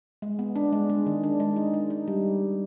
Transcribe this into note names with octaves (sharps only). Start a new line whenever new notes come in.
G#3
B3
D4
G#3
G#3
D#3
D4
G#3
D#4
D#4
D#4
G3